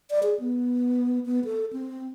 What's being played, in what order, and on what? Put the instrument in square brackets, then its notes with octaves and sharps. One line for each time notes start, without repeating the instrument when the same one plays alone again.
[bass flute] D5
G#4
B3
B3
A4
C4